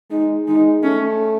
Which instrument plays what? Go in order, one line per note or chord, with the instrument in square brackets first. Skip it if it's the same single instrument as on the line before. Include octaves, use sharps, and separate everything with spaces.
[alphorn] G#3 [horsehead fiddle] D#4
[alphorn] G#3 [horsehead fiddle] D#4
[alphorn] A3 [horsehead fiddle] C#4